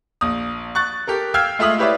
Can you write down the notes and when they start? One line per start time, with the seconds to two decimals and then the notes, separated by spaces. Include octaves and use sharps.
0.21 A#1 D#6
0.75 C#6 F#6 A6
1.07 G4 A4 A#4
1.34 F5 G5 E6 F6 G#6 C7
1.59 G#3 A3 F4 E5 D#6 F#7
1.78 E4 G4 B4 C#5 D5 E5